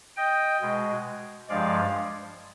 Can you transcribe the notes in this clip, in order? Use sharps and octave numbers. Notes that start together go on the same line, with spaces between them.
D#5 G5
B2 G#3
G2 F3 G#3 D5 F5